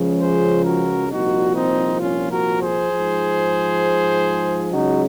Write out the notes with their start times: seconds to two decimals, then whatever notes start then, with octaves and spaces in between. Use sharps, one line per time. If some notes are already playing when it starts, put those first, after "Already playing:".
Already playing: C#2 C#3 F3
0.20 G#4 C5
0.65 F#4 A#4
1.10 C2 A#2 F3 D#4 F#4
1.55 C4 D#4
2.00 C#4 F4
2.30 F#4 A#4
2.60 G#4 C5
2.90 G#2 F3
4.70 C#2 C#3 F#3 D#4 F#4